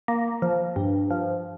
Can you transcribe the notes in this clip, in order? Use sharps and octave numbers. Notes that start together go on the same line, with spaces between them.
A#3
F3
G2
F3